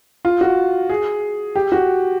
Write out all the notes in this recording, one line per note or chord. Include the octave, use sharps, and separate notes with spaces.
F4
F#4
G#4
G4
F#4